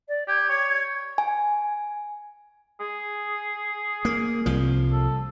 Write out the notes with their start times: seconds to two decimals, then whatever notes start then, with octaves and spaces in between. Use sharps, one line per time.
0.08 D5
0.28 G4 G#6
0.49 C#5
1.18 G#5
2.81 G#4
4.05 A#3
4.46 C2 F3
4.92 A4